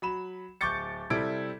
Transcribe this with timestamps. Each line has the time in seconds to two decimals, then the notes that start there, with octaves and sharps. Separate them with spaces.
0.02 F#3 B5 E7
0.61 D1 C#6 D6 G6 A6 C#7
1.10 C3 G3 E4 A4 G#6 D7